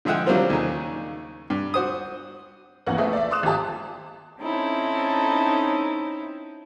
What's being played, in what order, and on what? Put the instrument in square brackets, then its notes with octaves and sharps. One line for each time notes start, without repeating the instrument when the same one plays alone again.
[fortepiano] D3 F3 G#3 E5 F#5 G5
D3 F#3 G3 A#3 C4 F4
D#2 C#3
G2
F#4 C5 D#6
[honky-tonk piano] A#1 E2 A#3 B3 C#4 F#5
A3 B3 G#4 C5 D#5 E5
D5 E5
C6 D6 D#6 F#6 E7
G#1 F4 G4 A5
[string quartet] C4 C#4 D#4 E4 A4